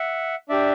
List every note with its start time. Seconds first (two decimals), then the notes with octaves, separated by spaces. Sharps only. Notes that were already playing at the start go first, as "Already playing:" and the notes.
Already playing: E5 F#5
0.49 D4 G4 D5 E5